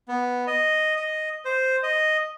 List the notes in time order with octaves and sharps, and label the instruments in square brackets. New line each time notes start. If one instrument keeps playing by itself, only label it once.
[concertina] B3
D#5
D#5
C5
D#5